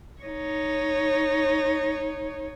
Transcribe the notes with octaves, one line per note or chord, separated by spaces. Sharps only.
D#4 C#5